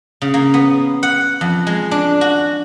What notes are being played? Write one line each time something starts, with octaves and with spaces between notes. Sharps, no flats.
C#3
A#3
B3
F#5
F2
G#3
D4
F#4